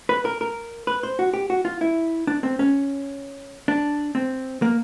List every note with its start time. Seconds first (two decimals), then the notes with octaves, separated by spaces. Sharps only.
0.09 B4
0.25 A#4
0.41 A#4
0.87 B4
1.03 C5
1.19 F#4
1.34 G4
1.50 F#4
1.65 F4
1.81 E4
2.27 D4
2.43 C4
2.59 C#4
3.68 D4
4.15 C4
4.62 A#3